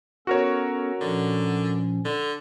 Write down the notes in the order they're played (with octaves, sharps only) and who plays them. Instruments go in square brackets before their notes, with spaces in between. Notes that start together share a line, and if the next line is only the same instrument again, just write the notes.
[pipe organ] B3 C#4 A4 [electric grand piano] F#4 A#4 C#5
[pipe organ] A#2 F3 C#4 [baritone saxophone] D3
[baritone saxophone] D3